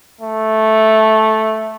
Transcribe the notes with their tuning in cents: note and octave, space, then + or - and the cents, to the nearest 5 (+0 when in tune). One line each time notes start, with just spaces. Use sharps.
A3 -5